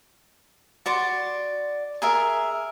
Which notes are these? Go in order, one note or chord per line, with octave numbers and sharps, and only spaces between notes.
F#4 D5 C6
G#4 A#4 E5